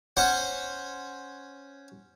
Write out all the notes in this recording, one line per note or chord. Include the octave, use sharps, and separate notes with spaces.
C#4 C5 C#5 F#5